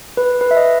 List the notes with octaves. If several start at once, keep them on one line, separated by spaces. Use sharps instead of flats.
B4
B4
E5
D#5